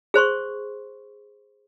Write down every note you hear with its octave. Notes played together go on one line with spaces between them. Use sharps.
G#4 C5 C6 C#6